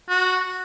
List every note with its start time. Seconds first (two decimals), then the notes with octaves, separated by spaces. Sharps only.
0.09 F#4